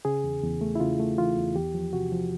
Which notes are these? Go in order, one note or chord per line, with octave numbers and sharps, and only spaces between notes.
C#3 G#4
E2
E2
A3
E4
C#3 F4
A3
E3 F4
E2
E2 G4
F3
C3 F#4
F3